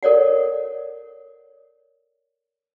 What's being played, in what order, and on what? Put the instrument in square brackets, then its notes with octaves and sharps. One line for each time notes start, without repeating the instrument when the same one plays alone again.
[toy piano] A4 A#4 C#5 D5 F#5